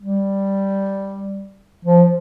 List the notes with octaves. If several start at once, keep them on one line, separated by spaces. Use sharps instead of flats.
G3
F3